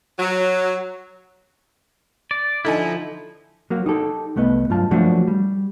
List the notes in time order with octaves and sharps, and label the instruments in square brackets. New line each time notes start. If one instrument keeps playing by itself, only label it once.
[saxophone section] F#3
[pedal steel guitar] D5
[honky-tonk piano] D3 D#4 G#5 [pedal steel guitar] F3 E4
[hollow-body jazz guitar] F#3 A#3 F#4
D#4 G4 A4
C2 A3 B3 B4 D#5
G2 F#3 F4 A5
F3 F#3 A3 A#3 D4 F#4
G3